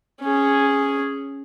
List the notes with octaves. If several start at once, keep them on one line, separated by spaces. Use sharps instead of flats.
C#4 G#4